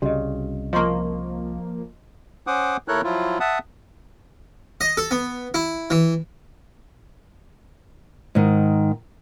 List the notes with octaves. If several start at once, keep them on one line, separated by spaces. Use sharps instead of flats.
C2 C#3 G3 F#4 D#5
F3 A#3 D#5 C6 C#6
C#4 C5 F#5 D6 D#6
D#2 E4 A4 A#4 C#5 F#6
F3 F#3 E4 F4
E5 F#5 A5 D#6
D#5
A4
B3
E4
E3
G#2 D#3